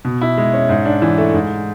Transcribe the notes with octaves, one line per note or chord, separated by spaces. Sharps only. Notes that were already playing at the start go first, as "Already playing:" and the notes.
B2
E4
G#3
C#4
G#2
D4
E3
A3
G#2